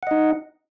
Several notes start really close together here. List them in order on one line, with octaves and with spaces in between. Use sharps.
F#5 D#5 D#4